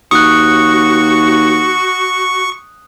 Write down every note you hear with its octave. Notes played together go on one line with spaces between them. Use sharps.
D#2 F#4 C#6 D#6 F#6